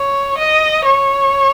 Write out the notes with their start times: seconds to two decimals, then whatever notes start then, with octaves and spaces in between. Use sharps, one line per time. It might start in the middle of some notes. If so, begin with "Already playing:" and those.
Already playing: C#5
0.38 D#5
0.85 C#5